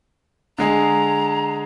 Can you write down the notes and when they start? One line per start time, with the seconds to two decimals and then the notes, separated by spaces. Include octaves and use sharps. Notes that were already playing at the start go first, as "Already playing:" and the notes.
0.58 D3 G#3 G#4 A#5